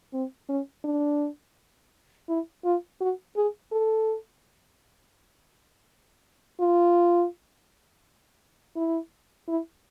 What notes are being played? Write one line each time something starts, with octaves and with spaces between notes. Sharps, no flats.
C4
C#4
D4
E4
F4
F#4
G#4
A4
F4
E4
E4